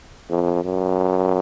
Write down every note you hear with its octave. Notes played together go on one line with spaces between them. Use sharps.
F2
F#2